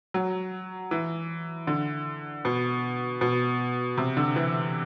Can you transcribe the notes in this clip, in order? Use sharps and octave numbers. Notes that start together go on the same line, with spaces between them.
F#3
E3
D3
B2
B2
C3
D3
E3